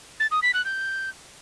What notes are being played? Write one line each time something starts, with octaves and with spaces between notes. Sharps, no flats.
A6
D#6
B6
F#6
G6